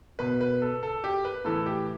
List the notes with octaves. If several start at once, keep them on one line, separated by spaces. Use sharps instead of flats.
B2 B4
B4
A4
A4
G4
B4
A2 E3 A4
G4